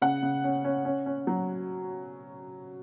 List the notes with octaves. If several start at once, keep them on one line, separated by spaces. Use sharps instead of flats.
C#3 F#5
C#3
C#4
C#4
C#4
C#4
F#3